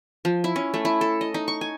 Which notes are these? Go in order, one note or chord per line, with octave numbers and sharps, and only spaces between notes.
F3
E4
C#4
A3
E4
A4
D#5
D#4
C#6
G#5